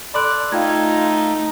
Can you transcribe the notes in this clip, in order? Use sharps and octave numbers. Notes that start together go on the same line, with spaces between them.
A4 D5 B5 C6 F#6
A3 D#4 F4 F5 G5 A#5 G#6